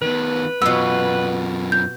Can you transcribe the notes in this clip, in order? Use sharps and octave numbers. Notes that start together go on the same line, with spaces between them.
D#3 B3 B4
F#2 B2 B3 F4 E6
G6